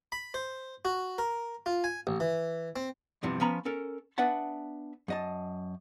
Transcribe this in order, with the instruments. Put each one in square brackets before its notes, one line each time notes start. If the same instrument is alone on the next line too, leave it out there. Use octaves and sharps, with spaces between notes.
[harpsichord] B5
C5
F#4
A#4
F4
G#5
A1
E3
C4
[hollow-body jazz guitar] E2 G2 C3 E3 F3
F3 B3 C#4 A#5 B5
C#4 A4 A#4
B3 D4 B4 E5 F#5 A5
F#2 D#5 A5